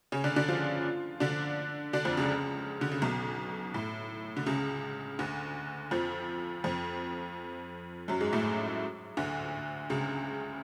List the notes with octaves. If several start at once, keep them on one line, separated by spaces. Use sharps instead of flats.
C#3 C#4
D3 D4
D3 D4
F3 F4
D3 D4
D3 D4
F2 F3
C#2 C#3
D3
C#3
B1 B2
A2
D3
C#2 C#3
D2 D3
F2 F3
F2 F3
F#2 F#3
G#2 G#3
A2 A3
D2 D3
C#2 C#3